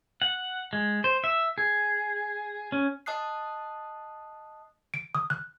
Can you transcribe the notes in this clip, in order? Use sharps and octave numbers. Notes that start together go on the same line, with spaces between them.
F#5
G#3
C5
E5
G#4
C#4
D#5 A5 D#6 F#6 C7
D7
D#6
F#6